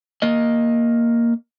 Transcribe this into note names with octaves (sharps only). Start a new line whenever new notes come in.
A#3 D#5